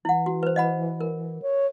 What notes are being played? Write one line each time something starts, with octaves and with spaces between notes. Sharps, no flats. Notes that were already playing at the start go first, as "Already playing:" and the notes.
E3 E4 F#5
F#4
B4 C5
D#5 F#5 B5
A#4
C#5